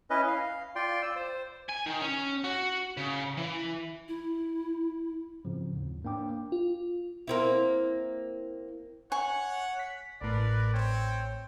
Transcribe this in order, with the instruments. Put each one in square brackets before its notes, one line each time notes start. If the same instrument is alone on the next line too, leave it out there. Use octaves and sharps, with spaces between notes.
[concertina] C#4 E4 B4 D#5
F5
F4 D5 G5 C6
D5 E6
C5
[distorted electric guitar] G#5
D#3
C#4
F#4
C#3
E3
[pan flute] E4
[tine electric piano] G#2 C#3 F3 C4
D#2 G#2
A#3 D4 G5 D6
[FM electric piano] F4
[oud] A#3 C4 E4
[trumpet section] C#5 F#5 [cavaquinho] G#5 C#6
[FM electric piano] B6
[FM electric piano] A1 A2 [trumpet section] A#4 B4 D5
[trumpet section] C4 C#5 G5